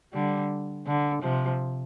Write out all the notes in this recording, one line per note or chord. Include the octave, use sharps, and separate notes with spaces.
D3 G3
D3
C3 F3